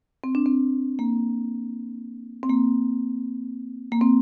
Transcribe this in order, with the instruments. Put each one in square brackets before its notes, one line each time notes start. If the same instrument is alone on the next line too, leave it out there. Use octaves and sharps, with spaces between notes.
[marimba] C4
D4
C4
A#3
C4
A#3
A#3
C4